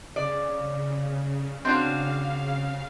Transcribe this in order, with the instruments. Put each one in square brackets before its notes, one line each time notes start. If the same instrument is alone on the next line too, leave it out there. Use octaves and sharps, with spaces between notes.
[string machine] C#3 [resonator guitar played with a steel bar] D5
[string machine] C#3 F5 [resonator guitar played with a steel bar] C4 D4 F#4